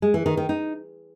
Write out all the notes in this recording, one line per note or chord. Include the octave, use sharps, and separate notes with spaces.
G#3
E3
D#3
D#3
D#4